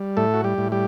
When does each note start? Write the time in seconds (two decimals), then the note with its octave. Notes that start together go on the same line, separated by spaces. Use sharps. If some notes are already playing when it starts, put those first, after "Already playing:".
Already playing: G3
0.17 A2 A3 A4
0.34 F#4
0.44 G3 G4
0.58 A2
0.72 G3 G4